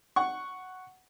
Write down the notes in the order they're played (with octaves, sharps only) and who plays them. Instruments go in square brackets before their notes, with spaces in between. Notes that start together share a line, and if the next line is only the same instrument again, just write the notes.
[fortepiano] F#5 C#6